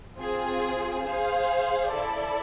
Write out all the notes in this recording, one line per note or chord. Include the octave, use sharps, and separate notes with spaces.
C4 F4 G#4
G#4 C5 F5
E4 A4 D5